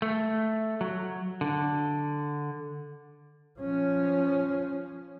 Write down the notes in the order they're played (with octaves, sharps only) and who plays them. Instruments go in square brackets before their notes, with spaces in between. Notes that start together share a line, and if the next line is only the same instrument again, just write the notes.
[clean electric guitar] A3
F#3
D3
[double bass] F3 C#4